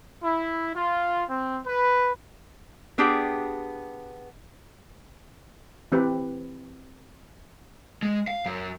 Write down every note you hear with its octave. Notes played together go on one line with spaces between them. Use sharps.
E4
F4
C4
B4
B3 D4 G4 G#4 G5
E3 C4 G4 B4
G#3
F5
F#2